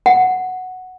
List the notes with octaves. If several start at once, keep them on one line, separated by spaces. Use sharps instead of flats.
F#5